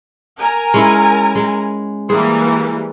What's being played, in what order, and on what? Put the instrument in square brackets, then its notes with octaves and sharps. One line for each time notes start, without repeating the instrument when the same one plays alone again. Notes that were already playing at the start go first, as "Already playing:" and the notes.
[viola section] A#4 G#5 A#5
[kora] G#3 C#4 E4
G#3
[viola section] E3 G3 A#3 [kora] G#4 C5